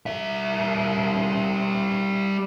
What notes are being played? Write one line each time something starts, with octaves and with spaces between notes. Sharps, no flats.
G3 E5